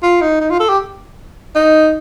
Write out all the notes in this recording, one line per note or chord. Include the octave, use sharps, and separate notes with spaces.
F4
D#4
D#4
F4
A4
G4
D#4